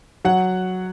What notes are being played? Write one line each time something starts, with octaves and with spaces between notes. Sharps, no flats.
F#3 F#5